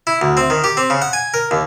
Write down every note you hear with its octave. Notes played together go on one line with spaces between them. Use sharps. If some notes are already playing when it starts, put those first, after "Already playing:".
E4
D2
C4
D#3
G4
C4
C#3
F#5
G#5
A#4
D#2